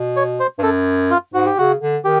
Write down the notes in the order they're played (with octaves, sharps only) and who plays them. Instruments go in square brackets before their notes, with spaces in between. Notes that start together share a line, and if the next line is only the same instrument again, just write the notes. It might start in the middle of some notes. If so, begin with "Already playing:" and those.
Already playing: [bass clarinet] B2
[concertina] C#5
C5
[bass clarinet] G2
[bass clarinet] F#2 [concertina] A4
[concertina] F4
[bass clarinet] G#2 [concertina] F#4
[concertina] G4
[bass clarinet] C#3 [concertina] F#4
[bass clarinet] D3
[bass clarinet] D#3 [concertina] G4